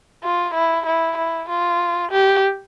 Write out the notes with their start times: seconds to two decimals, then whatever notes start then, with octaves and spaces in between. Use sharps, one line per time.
0.24 F4
0.54 E4
0.86 E4
1.17 E4
1.49 F4
2.11 G4